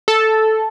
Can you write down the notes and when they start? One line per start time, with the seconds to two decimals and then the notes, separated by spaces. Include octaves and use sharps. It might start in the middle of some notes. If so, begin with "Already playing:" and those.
0.08 A4